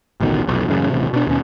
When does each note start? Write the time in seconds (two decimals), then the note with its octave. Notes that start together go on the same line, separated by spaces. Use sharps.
0.20 A1 D2 B2 D#3
0.46 F1 B1
0.67 A1 F#2 C#3
0.90 D#1 A1 C3
1.13 B2 D4
1.27 D#2 B2 C#4